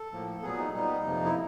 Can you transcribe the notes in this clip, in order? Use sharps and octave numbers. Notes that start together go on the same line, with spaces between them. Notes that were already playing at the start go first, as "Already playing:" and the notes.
Already playing: A4
A2 F3 A#3
A#2 F#3 B3 G#4
D#4
A#2 G3 B3 D#4
F2 C3 F3 A#3
E4